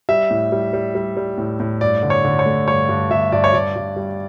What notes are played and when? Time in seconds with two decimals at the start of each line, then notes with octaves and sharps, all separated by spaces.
0.09 G3 E5
0.31 A2
0.52 G3
0.73 G3
0.95 G3
1.17 G3
1.38 A2
1.60 A2
1.81 G2 D5
2.03 D3
2.10 C#5
2.25 D3
2.39 C#5
2.46 A3
2.68 G2 C#5
2.89 G2
3.11 G2 E5
3.32 G2 D5
3.44 C#5
3.54 G2 D5
3.76 G2
3.96 G3